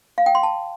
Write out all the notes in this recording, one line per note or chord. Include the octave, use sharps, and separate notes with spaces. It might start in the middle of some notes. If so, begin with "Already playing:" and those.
F5
G5
C6
A5